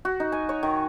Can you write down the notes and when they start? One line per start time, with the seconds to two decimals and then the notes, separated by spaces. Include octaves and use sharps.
0.05 F#4
0.20 D#4
0.32 G#5
0.49 C#5
0.63 D#3